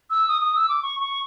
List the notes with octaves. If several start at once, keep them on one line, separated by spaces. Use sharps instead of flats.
E6
D#6
D#6
E6
D6
C#6
C#6